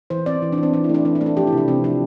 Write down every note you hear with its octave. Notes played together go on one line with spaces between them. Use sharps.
E3 C5
C4 D5
E3
D4
E3
C4
E3 D4
E4
A3 D4
E3 D4
D4
A3
D4
F3 G4
E4
C3 D4
C3 C4
F3 D4